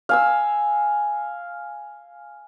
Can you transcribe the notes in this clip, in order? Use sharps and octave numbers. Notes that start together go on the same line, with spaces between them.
F5 G#5 E6